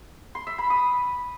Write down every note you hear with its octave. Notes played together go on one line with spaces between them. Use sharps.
C6
E5
B5
D#6